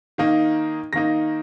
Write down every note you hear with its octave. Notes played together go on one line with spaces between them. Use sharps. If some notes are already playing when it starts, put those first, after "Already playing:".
D#3 A#3 D#4
D#3 A#3 D#4 A#6